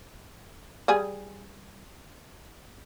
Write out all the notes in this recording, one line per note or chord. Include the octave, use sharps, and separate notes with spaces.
G3 G#4 G#5